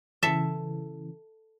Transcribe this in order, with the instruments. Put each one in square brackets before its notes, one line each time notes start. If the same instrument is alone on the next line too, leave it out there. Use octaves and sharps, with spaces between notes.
[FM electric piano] C#3 E3 [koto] A4 E5